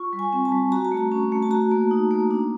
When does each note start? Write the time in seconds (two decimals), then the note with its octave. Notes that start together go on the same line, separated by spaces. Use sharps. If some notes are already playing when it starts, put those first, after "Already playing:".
Already playing: F4 C#6
0.13 G3
0.19 G#5
0.33 C4
0.45 A5
0.52 G3
0.72 F#4 A#5
0.85 A5
0.92 A3
0.97 A#5
1.12 C#4
1.32 A3
1.42 A5
1.51 F#4 A#5
1.71 A#3
1.91 D#4
2.11 A#3
2.31 D4